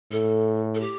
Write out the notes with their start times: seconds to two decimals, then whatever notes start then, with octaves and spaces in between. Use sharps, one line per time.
0.11 A2 A4
0.75 A4
0.80 G4